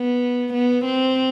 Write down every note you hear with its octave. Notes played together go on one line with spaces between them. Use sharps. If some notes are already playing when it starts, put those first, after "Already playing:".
Already playing: B3
B3
C4